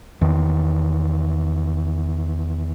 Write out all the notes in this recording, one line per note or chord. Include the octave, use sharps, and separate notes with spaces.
E2 D#3